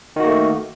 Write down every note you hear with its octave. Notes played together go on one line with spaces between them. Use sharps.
D#3 A3 A#3 F#4